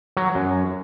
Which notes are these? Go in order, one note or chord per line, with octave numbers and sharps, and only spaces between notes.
F#3
F#2